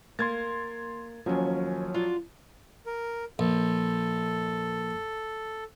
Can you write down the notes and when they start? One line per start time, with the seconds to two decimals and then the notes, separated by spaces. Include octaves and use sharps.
0.19 A#3 C6 G#6 A6
1.26 D#2 F3 F#3 C#4 G#5
1.94 F4 F#4 D5
2.86 A#4
3.39 A#1 A4